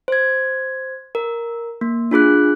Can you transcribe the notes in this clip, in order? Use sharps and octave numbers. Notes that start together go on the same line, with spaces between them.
C5 G#6
A#4
A#3
D4 F4 G#4 F#6